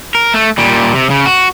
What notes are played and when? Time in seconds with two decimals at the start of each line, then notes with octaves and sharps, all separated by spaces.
0.15 A#4
0.34 A3
0.58 A#2 G3
0.95 C3
1.10 C#3
1.26 F#4